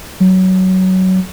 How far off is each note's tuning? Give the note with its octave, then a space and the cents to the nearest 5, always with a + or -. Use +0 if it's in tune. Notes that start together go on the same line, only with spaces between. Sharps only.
F#3 +15